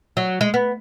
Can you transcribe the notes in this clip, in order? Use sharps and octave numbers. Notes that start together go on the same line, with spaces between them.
F#3
G#3
B3